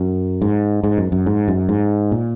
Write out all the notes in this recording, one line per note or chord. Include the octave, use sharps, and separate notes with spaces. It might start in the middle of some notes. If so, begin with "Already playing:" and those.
Already playing: F#2
G#2
G#2
F#2
F#2
G#2
F#2
G#2
A#2